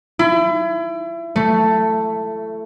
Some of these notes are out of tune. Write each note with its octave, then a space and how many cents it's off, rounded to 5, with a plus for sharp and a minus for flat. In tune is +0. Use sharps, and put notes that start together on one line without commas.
E4 +30
A3 +5